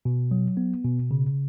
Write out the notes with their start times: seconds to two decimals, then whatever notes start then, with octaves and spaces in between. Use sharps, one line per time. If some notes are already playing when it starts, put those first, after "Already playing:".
0.05 B2
0.31 F#3
0.57 B3
0.85 B2
1.11 C#3